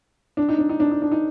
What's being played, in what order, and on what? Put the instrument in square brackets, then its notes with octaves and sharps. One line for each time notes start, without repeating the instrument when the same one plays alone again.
[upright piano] D4
D#4
D4
D#4
D4
D#4
D4
D#4